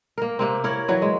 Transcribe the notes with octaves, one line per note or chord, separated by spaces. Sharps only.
A#3 A#4
C3 A#3 C4
E4 A#4 C#5
E3 F#3
G#3